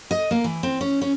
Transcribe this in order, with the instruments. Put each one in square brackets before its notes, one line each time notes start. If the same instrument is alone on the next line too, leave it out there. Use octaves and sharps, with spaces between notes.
[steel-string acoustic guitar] D#5
A#3
E3
C4
C#4
C#4